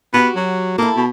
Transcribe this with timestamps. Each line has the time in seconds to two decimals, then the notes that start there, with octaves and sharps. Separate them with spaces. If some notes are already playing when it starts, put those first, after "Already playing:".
0.14 B3 F#4 G4
0.36 F#3
0.78 A#3 E4 A4
0.96 B2